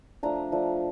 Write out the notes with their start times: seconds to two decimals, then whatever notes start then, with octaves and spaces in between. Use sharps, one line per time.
0.23 F3 A3 D4 A#5
0.52 F3 A3 D4